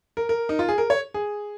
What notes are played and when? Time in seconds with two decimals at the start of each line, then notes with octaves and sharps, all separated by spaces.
0.17 A#4
0.29 A#4
0.49 D#4
0.59 F4
0.69 G#4
0.78 A#4
0.90 C#5
1.14 G#4